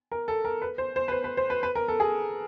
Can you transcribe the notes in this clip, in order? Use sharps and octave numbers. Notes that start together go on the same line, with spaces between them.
A#4
A4
A#4
B4
C5
C5
B4
C5
B4
C5
B4
B4
A#4
A4
G#4